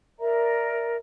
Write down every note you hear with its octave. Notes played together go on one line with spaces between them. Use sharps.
A#4 D5 E5 A#5